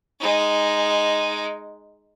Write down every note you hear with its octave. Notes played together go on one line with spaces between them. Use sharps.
G#3 D#4